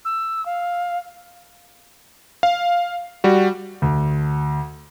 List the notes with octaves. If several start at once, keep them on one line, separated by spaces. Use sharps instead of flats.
E6
F5
F5
G3 F#4
D2